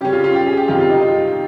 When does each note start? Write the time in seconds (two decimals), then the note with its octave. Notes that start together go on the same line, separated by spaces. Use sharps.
0.01 C#3 G3 C#4 G4
0.13 F4
0.24 F4
0.34 G4
0.46 G#4
0.57 G4
0.68 C3 D#3 G3 F4
0.80 F4
0.90 D#4
1.02 F4